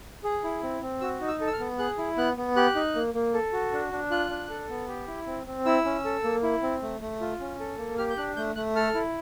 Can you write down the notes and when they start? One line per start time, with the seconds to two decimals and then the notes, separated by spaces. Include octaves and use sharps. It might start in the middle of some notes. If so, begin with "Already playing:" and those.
0.24 G#4
0.44 E4
0.63 C4
0.82 C4
1.01 F#4 E6
1.21 D#4
1.28 E6
1.40 A4
1.47 E6
1.53 F6
1.59 B3
1.79 G#4 F#6
1.98 E4
2.17 B3 F#6
2.37 B3
2.56 G4 F#6
2.75 D#4
2.95 A#3
3.14 A#3
3.34 A4
3.53 F#4
3.72 D4
3.92 D4
4.11 F4 F#6
4.30 D4
4.50 A4
4.69 B3
4.88 G4
5.08 E4
5.27 C4
5.47 C4
5.65 E4 E6
5.85 C#4
6.05 A4
6.24 A#3
6.43 E4
6.62 C4
6.82 A3
7.01 A3
7.21 F4
7.40 C#4
7.60 A4
7.78 A#3
7.98 G4 F6
8.10 G6
8.17 D4 F#6
8.36 A3 G6
8.55 A3 F#6
8.75 A4 F6
8.94 E4